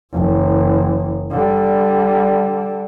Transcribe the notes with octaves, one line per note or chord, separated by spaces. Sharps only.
F#1 E3
D3 G3